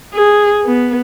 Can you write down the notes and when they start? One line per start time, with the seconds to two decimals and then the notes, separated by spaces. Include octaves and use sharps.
0.14 G#4
0.65 B3